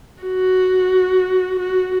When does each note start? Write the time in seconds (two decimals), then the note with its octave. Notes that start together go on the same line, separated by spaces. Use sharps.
0.23 F#4
1.59 F#4